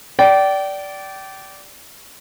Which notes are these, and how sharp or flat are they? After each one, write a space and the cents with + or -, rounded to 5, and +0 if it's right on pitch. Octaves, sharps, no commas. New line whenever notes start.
D5 -15 G5 -30